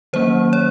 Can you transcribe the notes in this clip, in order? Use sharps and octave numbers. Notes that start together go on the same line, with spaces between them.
D#3 F#3 A#3 C#4 C5
C#5